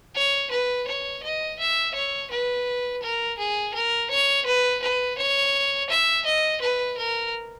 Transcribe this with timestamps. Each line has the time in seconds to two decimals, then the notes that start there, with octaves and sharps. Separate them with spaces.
0.15 C#5
0.51 B4
0.87 C#5
1.23 D#5
1.59 E5
1.94 C#5
2.30 B4
3.02 A#4
3.38 G#4
3.74 A#4
4.10 C#5
4.45 B4
4.82 B4
5.18 C#5
5.89 E5
6.25 D#5
6.61 B4
6.97 A#4